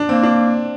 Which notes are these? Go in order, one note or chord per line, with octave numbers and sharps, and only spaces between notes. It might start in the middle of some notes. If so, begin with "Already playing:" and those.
Already playing: D4
A#3 C4
D4